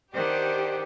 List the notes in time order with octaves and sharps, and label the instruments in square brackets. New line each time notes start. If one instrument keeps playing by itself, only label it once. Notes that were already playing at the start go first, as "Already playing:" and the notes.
[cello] D#3 D4 [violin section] G4 [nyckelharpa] C5 F#5